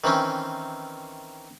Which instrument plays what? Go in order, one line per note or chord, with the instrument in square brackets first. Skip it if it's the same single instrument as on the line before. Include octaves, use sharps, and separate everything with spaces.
[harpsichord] D#3 E3 C4 C#4